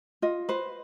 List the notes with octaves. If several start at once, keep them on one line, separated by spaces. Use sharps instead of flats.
F4 D#5
B4 C5